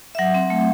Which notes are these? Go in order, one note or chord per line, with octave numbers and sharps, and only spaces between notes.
E5
F#3 F#5
C4
A3